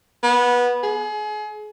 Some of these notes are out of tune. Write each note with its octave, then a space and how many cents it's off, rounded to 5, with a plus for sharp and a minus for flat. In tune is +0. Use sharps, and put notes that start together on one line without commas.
B3 -15
G#4 +30